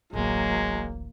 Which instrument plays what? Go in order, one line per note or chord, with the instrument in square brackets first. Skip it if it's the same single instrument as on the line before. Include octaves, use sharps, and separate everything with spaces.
[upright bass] D1 A1 [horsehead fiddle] F#3 A#3 [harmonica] G#3